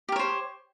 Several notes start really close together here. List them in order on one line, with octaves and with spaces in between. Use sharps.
G4 A#4 C#5 C5